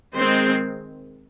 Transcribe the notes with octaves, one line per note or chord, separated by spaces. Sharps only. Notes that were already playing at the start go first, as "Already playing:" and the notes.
D#3 G#3 C4 C5